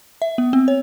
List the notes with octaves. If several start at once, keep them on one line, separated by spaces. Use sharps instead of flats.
E5
B3
C4
C#5